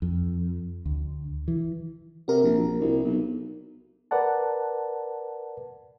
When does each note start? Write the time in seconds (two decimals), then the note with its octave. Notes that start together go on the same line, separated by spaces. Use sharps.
0.02 F2
0.85 D2
1.48 E3
2.28 C3 F#4 A#4
2.43 A#1
2.58 A#1
2.80 C2
3.03 B1
4.11 A#4 B4 D5 F#5 A5